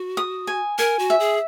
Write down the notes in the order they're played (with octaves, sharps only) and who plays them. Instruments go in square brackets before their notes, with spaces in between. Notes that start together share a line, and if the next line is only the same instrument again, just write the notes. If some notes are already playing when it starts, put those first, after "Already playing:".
Already playing: [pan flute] F#4
[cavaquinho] D#6
G#5
[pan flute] A#4 [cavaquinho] G#5
[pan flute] F#4
[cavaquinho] E5
[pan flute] G#4